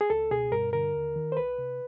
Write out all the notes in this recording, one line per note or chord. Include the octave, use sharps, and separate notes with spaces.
G#4
C#2 A4
B2 G#4
G2 A#4
D3 A#4
D#2
D#3
C5
C2 B4
C3